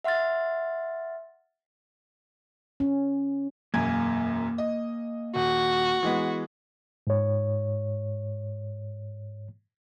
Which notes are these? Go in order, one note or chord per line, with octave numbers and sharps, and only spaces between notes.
E5 F#5 C6 F6 A6
C#4
E1 F#2 A#3 G#5 G#6
D#5
D#1 F#4
E3 G#3 B3
G#2 C#5